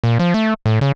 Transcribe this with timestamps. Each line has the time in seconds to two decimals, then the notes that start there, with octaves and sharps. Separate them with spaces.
0.04 A#2
0.19 F3
0.34 A3
0.66 A2
0.81 C#3